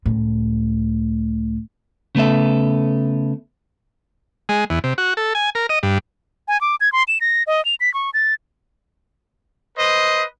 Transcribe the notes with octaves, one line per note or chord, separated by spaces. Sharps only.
C#2 A2
C#3 A3 B3 A4 E5
G#3
E2
C3
F#4
A4
G#5
A#4
D#5
G2
G#5
D6
G#6
C6
E7
A#6
D#5
F7
B6
C#6
A6
B4 C5 D#5